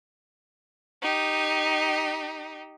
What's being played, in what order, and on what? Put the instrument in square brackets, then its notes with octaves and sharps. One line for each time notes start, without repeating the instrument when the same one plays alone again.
[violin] D#4 G4